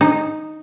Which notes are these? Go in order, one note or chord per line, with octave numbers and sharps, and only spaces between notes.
D#4